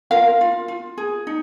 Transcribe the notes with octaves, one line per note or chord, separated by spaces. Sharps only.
F4 A#4 F5
F4
F4
G#4
D#4